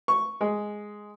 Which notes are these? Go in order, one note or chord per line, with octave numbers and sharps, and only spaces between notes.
C#6
G#3